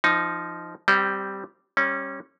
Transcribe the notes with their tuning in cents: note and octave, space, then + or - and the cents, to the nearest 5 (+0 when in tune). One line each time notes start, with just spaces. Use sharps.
F3 -15 D#4 +0
G3 -5 C4 +0 G5 -35
G3 +0 C#4 -25